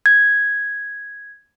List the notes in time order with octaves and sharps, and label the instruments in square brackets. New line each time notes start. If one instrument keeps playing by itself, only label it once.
[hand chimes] G#6